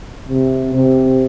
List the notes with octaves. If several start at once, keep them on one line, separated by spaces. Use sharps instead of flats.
C3
C3